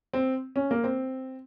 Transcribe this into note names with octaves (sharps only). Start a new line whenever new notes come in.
C4
C#4
A#3
C4